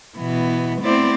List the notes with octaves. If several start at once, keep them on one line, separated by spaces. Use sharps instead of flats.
B2 E3 B3
A3 B3 C4 E4 C5 D5